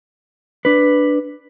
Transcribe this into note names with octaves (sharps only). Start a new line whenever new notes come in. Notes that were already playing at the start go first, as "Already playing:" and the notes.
D4 B4